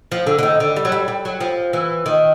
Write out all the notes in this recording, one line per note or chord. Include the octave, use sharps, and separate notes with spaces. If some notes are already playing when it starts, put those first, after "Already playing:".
F3
D3
D3
D#3
D3
G3
F#3
G3
G3
F#3
F3
E3
D#3